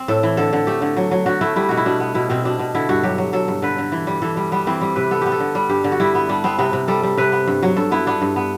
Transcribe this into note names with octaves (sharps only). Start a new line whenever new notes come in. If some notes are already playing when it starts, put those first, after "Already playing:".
Already playing: C4
A2 A4
E3
D3 A4
D3
A3 G4
D3
F#3
F#3
D3 F#4
A3 E4
G3 E4
B2 F#4
E4
B2 D4
B3
B2 E4
B2 C4
B2 D4
B2
D3 E4
G2 F#4
F#3 G4
F#3
F#3 A4
G2
D3 B4
D3
E3
G3
E3 A4
G3
G3 B3
E3 C4
G3
C3 B4
B3 A4
B3 G4
A4
D3
G3
G2 G4
D3
F#4
G3 E4
B3
G3 D4
B3 C4
C3 B3
C3
G3 A4
G3
C3 B4
B3
G2
F#3
G2 A4
B3 E4
B3 D4
G2
B3